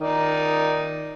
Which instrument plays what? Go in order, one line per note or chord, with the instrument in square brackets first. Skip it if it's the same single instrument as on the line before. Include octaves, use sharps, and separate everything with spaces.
[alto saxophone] D#3 [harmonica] D#4 D5